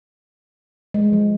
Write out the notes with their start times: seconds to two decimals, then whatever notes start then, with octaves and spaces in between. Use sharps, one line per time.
0.94 G#3
1.13 F3